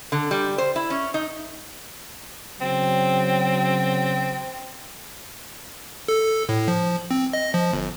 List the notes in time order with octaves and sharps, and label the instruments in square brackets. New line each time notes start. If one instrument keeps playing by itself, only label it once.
[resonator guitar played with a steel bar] D3
G3
C5
E4
C#4
D#4
[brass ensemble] C#3 F#3 [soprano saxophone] C4
[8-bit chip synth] A4
A2
F3
C4
D#5
F3
G1